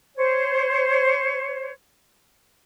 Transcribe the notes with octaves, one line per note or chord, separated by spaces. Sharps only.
C5 C#5